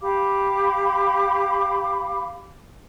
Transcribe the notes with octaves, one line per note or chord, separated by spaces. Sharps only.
G4 F5 B5 D6